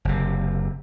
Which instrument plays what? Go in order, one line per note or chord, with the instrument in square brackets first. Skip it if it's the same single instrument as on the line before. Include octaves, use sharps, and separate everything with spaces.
[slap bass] F#1 C3